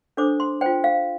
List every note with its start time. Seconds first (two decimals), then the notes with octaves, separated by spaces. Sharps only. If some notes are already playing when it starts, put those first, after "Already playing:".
0.17 D4 A4 C5 D6
0.40 C6
0.61 F4 C5 G5
0.84 F5